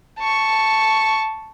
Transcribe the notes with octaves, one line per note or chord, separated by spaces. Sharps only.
A5 C#6